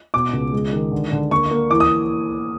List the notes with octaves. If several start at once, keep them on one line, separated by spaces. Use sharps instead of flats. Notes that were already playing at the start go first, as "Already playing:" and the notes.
B2 D6
C#2
G#3
D#3
D3
D3
A#3 C#6
A#3
E3 D6
D#6